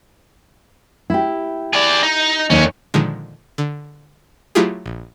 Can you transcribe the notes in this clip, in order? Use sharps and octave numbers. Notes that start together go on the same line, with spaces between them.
E4 G4
G#4 D5
D#4
D#2 D3 C#4 D#4
A#2 D3 D#3 F3 G#3
D3
F#3 A3 E4 F4 G4 G#4
A#1